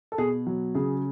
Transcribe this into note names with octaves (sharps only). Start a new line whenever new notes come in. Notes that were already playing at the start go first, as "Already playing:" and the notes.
A4
B2 G#4
F#3
C#3 G#4